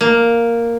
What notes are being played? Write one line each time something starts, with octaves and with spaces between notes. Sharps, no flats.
A#3